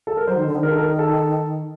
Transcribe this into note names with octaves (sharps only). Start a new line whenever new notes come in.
A4
A#4
F#3 C5
D#3
D3
D#3
A#4
A4
A#4
A4